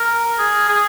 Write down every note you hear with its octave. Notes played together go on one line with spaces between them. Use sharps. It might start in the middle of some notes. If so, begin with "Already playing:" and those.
Already playing: A#4
G#4
G#4